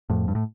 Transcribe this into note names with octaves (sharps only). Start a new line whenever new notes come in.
F2 A2
G2
A2